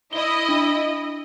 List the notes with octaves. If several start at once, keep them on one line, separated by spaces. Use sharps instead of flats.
E4 D#5 G7
D4